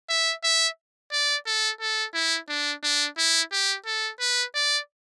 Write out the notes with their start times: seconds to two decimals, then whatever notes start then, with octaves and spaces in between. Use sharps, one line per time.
0.09 E5
0.44 E5
1.12 D5
1.47 A4
1.80 A4
2.14 E4
2.49 D4
2.83 D4
3.18 E4
3.52 G4
3.86 A4
4.20 B4
4.55 D5